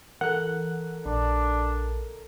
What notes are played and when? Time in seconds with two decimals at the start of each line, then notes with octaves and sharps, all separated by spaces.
0.21 E3 A4 A#4 F#5 F#6
1.06 A#1 D4